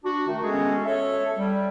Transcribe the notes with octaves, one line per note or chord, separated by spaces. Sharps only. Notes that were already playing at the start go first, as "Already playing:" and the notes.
D4 F#4
D#3 A3
G#3 B3 C#4 F#4 G#4 A4
A4 C#5 E5
G3